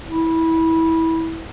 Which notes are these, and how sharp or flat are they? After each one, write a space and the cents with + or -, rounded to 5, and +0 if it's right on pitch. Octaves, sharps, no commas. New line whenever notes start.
E4 -20